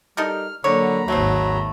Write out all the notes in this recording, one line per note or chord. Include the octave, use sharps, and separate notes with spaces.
G3 D#4 A4 A#4 F6
D3 F#3 A#3 C#5 A#5 B5
G#1 D#2 F#3 A3 C5